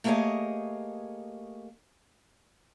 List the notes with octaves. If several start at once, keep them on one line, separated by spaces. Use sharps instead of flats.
A3 A#3 G4 G#4 C#5 D#5